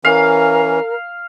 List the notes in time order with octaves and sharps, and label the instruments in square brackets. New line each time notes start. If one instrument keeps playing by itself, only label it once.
[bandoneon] E3 C#4 [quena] A#4 [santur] F5